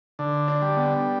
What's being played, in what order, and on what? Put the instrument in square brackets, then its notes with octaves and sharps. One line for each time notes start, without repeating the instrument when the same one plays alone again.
[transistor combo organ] D3
[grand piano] D4
[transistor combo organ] G3
[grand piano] B3